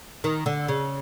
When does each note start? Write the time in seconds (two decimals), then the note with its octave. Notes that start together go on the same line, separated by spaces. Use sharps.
0.24 D#3
0.46 D3
0.68 C#3